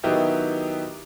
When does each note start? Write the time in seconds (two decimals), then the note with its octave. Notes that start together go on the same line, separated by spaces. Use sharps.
0.03 D#3 F#3 B3 E4 G4 D#5